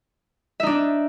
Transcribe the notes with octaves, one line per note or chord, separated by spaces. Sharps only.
D4 D#4 E5